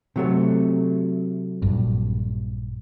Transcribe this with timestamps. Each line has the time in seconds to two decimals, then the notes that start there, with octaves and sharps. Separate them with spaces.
0.16 C3 F#3 A3
1.62 A#1 G2